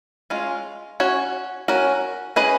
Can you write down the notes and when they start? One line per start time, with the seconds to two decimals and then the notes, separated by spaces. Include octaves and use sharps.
0.30 G#3 C#4 F4
1.00 C#4 F#4 C#5
1.68 C#4 F#4 A#4
2.36 C#4 G#4 B4 D#5